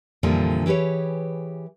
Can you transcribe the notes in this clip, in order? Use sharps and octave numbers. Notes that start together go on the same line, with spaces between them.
F2 A#2 D3 E3 F3 G3
E3 G4 G#4 B4 C#5